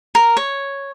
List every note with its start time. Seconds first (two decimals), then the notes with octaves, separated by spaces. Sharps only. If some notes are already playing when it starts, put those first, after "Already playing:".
0.15 A#4
0.37 C#5